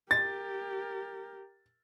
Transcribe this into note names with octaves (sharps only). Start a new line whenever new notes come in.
G4 A#4 A6